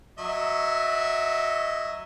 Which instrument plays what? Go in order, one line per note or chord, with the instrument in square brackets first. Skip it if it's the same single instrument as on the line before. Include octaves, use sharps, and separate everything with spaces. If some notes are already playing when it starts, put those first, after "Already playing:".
[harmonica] F#3 D#5 E5